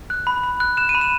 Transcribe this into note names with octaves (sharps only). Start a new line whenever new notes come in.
F#6
B5
B5
F#6
F#6 E7
D#7
B5
E7